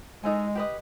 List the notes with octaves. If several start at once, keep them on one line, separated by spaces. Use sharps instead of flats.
G#3 D#4 A4 G#5
G4 B4 D#5